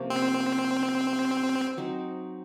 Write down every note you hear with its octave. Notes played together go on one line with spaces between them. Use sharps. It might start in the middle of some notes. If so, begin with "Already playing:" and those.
Already playing: C3 F3 A#3 C#4
C4
F#3 C4 D#4